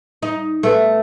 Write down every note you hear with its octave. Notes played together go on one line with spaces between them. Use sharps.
D#4
A3 B3